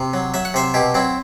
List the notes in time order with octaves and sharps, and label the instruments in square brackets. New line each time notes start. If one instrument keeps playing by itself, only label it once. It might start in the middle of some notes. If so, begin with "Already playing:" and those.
Already playing: [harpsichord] C3
F#3
F#3 E5
F#5
C3 C5 E5
B2 E4 G4
F#3 C4 E4